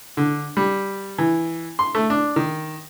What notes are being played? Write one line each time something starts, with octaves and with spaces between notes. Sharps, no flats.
D3
G3
E3
C6
A3
D4
D#3